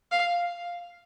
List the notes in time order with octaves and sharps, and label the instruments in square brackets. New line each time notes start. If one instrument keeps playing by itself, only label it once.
[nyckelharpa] F5